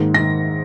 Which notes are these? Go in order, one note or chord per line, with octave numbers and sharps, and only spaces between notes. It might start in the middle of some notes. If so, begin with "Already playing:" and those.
Already playing: G#2 D#3 A#3
D#3 A#6